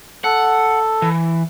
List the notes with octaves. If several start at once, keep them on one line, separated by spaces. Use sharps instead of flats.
A4 F#5
E3